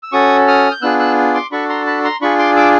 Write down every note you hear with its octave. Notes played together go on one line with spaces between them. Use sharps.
E6
C#4 F#4 A4 C#6 D#6
D#6 F6
G6
B3 D4 F4 G#4 E6 F#6
E6 F#6
C6 D6
D4 F#4 A4 B5 C#6
A#5 C6
A5 B5
A#5 C6
D4 F4 G#4 B5 C#6
C6 D6
D6 E6